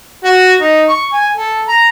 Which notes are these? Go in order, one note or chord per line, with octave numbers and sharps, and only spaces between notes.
F#4
D#4
C#6
G#5
A4
A#5